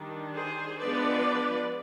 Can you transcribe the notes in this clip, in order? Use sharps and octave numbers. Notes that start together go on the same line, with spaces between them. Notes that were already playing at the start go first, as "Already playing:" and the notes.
Already playing: D#3 G3 D4
G#4 C5
F3 G#3 B3 D4 B4 D5